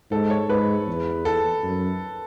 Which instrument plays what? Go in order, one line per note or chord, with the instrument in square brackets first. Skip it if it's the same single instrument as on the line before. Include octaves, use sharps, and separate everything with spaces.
[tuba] G#2 [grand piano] A4
[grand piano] C#5
[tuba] G#2 [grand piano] B4
[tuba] E2
[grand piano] A4
[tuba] F#2